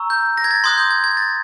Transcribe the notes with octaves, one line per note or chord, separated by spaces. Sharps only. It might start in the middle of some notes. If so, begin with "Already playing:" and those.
Already playing: A#5 C#6 E6
G6
A#6
G#6
A6
C6 D#6 F#6 G#6
G6
G#6
G#6
A6